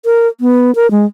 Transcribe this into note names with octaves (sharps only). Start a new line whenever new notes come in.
A#4
B3
A#4
G#3